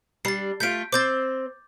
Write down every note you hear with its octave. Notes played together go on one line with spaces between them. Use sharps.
G3 D4 A6 C7
A3 F4 G6 B6 D7
C4 C5 D6 G6 A6